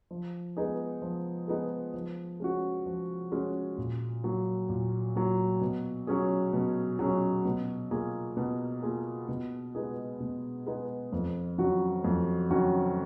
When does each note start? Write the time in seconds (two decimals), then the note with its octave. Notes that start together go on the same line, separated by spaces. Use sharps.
0.11 F3
0.57 G#3 B3 D#4 G#4
1.02 F3
1.48 G#3 B3 D#4 G#4
1.94 F3
2.40 G#3 C#4 F#4
2.86 F3
3.32 G#3 C#4 F#4
3.78 A#2
4.24 F#3 A#3
4.69 A#2
5.15 F#3 A#3
5.61 B2
6.07 F#3 C#4 G#4
6.53 B2
6.99 F#3 C#4 G#4
7.45 B2
7.91 A#3 F4 G#4
8.37 B2
8.83 A#3 F4 G#4
9.29 B2
9.75 G#3 B3 D#4 G#4
10.20 B2
10.66 G#3 B3 D#4 G#4
11.12 F2
11.58 D#3 F#3 C#4 F#4
12.04 F2
12.50 D#3 F#3 C#4 F#4